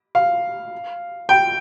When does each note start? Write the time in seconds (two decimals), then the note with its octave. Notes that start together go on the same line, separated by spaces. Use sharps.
0.15 F5
1.29 G5